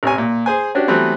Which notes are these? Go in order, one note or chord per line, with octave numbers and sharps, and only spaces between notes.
A1 C3 C#5 G#5
A#2
G#4 C5 G#5
C#4 D4 F#4 G4
E3 F#3 G3 A3 B3 C4